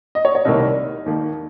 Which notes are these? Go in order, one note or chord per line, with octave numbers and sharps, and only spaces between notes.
D#5
C#5
C#5
C2 C3 D#3 G3 A#3 D#5
D#2 D#3 A#3